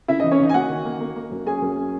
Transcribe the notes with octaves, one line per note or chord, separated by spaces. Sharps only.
C#3 E4 E5
D#4 D#5
E3
C#4 C#5
C#3 D#4 D#5
G#5
A#3 F#4 F#5
D#3
A#3
A#3
A#3
F#2
C#4 G#4 G#5
F#2
C#4